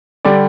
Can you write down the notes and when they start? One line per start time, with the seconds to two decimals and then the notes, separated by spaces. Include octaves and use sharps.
0.25 D3 G3 D5